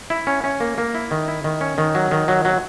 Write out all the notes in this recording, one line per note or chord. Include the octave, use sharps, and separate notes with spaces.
E4
C#4
C#4
A#3
A#3
E4
D#3
E4
D#3
C#4
D#3
F#3
D#3
F#3
F#3